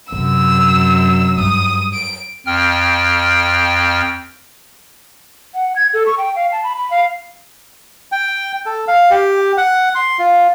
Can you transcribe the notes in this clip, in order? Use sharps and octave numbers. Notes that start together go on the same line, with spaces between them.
F#2 C3 E6
G2 G3 D#6
D7
F2 G5 F6
F#5
G#6
A4
C#6
G5
F5
A5
B5
B5
F5
G5
A4
F5
G4
F#5
C6
F4